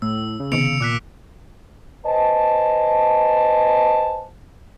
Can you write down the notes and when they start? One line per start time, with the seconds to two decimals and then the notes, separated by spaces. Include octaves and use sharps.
0.02 A2 E6
0.40 C#3
0.52 C3 D#3 B3 C#7 D7 F7
0.80 A#2 D6 F#6 B6
2.06 B4 C5 D#5 G#5 A5